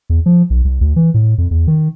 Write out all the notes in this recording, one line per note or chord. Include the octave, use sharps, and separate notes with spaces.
E2
F3
B1
C2
D2
E3
A2
F2
E2
D#3